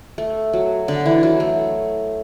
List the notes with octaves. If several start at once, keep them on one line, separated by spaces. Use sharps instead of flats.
A3
F#3
D3
E3
F#3
A3